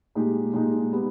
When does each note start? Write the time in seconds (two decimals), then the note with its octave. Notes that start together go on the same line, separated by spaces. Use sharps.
0.15 A#2 G#3 D#4 G4
0.54 A#2 G#3 D#4 G4
0.93 G3 B3